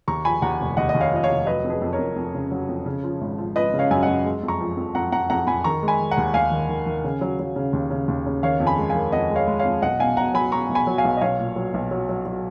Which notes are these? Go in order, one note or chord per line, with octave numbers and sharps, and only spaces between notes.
D#2 A#5 C#6
F3 G#5 B5
D#2 F#5 A#5
F1
D#2 D#5 F#5
D#5
D#2
C#5 F5
F3 D#5
C#5 F5
F1
F#3 B4 D#5
F2
G#4 B4
F2
A#4 C#5
F2
F2
C#3
F#3
F2
C#3
F3
G#1
F3
F3 B4 D#5
C#3
C#5 F5
F#2 G#5
D#5 F#5
F#2
G#3
F2
A#5 C#6
F3
F2
F2 F#5 A#5
F2 F#5 A#5
F2 F#5 A#5
F2 G#5 B5
D#3 A#5 C#6
G#3
G#5 B5
D#3
F#5 A#5
D#2
D#2 F5 G#5
D#3
D#3
D#3
C#3
F#3
F#3
C#3
D#2
C#3
D#2
C#3
D#3 C#5 F5
F2
G#5 B5
G#3
F5 G#5
D#3
F2 D#5 F#5
G#3
C#5 F5
G#3
C#5 F5
F2
B1 D#5 F#5
B2 F5 G#5
B2 F#5 A#5
F#3 G#5 B5
B2 A#5 C#6
B1
G#5 B5
F#3
F5 G#5
B1
D#5
B1 C#5 F5
A#2
F#3
B1
F#3
F#3
F#3